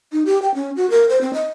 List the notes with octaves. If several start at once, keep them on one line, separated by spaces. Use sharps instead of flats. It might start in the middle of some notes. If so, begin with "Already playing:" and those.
D#4
G4
G5
C#4
F#4
A#4
C5
C4
D#5